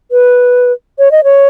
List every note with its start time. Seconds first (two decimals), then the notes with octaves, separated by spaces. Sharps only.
0.11 B4
0.99 C#5
1.11 D#5
1.24 C#5